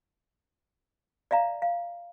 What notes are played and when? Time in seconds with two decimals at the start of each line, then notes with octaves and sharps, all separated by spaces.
1.31 D5 E5 F5 A#5
1.62 F5